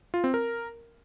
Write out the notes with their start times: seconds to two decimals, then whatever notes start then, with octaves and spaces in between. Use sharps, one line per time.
0.14 F4
0.24 C4
0.34 A#4